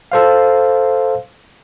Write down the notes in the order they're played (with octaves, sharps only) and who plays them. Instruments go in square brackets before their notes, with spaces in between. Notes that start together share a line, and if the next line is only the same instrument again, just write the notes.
[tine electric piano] A4 C5 F5